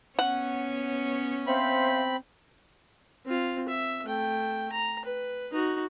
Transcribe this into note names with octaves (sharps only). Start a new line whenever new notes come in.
B3 C#4 C#5 F#5
C4 C5 E5 F5 B5
C4 F4
E5
A3 G5
A#5
B4
D#4 F#4